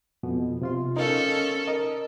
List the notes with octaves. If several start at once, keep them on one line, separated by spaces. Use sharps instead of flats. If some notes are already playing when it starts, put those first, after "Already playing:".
F2 B2
C3 F4 C6
C#4 D#4 A4 A#4 F5
A#4 D#5